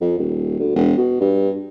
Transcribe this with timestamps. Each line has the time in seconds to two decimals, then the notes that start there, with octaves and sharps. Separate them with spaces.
0.01 F2
0.18 D#1
0.59 D2
0.75 E1
0.97 B2
1.20 G2